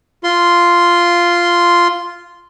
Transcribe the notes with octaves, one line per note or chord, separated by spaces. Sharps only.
F4 C6